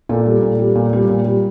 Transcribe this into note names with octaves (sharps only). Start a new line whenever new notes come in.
A#2 A4
G3
A#2
G3
A#2
G3
A#2
G3